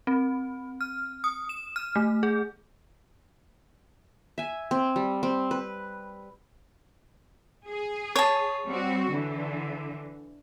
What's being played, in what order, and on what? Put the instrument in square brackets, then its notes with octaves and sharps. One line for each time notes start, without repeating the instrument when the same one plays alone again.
[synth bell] C4
F6
D#6
E7
F6
A3
G#4
[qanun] E5 G#5
C4
G3
C4
B4
[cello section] G#4
[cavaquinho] C#5 A5
[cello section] G3 C4 F#4
D3 E3